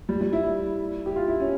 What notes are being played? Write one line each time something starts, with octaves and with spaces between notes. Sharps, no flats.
G3
G3
E4
G4
F4
E4
C#4